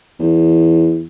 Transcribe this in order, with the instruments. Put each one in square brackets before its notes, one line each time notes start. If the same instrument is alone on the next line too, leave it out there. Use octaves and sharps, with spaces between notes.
[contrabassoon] E2